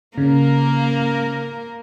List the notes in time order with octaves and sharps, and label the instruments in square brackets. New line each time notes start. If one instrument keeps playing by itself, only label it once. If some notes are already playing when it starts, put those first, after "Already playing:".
[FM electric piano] C#3 [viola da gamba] A#3 A#4